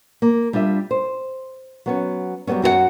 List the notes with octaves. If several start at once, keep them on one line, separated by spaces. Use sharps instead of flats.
A#3
G3 D4 F4 E5
C5
F#3 B3 C#4
F#3 G3 A3 B3 C#4
F#2 F#4 A#4 F#5